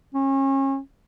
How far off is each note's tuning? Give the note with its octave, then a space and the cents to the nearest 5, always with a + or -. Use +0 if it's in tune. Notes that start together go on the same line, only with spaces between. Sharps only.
C#4 -35